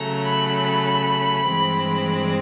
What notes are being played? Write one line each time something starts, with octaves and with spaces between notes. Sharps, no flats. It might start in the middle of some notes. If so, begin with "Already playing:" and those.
Already playing: C#3 F#3 A3 A#5
B5
G2 E3 G#3 C4